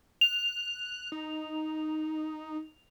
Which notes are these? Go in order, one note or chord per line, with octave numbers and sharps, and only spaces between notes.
F#6 F7
D#4